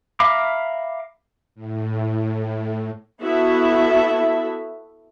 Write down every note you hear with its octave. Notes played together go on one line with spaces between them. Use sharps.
E5 F5 A#5 B5 D6
A2
B3 E4 F#4 A4 E5